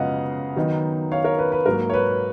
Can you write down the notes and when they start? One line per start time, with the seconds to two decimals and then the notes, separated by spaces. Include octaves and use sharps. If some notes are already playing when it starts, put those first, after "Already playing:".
Already playing: F#2 C#3 F3 G#3 B3 D#5 F5 F#5
0.56 D#3 F#3 B3 D#4
1.12 C#5 F5
1.24 A#4 C#5
1.39 B4
1.52 B4
1.66 G#2 F#3 A#3 A#4
1.90 C#5
1.94 B4